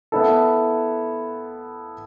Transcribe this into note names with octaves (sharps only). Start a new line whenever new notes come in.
B3 E4 A4